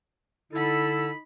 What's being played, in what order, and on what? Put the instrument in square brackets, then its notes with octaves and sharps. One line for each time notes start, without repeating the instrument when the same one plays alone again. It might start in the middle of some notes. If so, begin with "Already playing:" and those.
[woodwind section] D3 E4 A4 [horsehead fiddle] D#4 B5